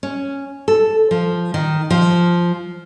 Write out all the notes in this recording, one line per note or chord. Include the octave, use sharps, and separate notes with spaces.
C#4
A4
F3
D#3
F3